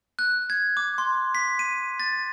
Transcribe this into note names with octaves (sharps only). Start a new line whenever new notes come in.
F#6
G#6
D6
C6
B6
D#7
A6